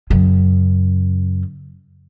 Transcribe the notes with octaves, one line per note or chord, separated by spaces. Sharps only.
F#2 C#3